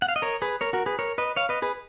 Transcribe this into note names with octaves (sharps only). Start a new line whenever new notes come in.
F#5
F5
D#5
A#4 C#5
G#4 B4
A#4 C#5
F#4 A#4
G#4 B4
A#4 C#5
B4 D#5
C#5 F5
B4 D#5
G#4 B4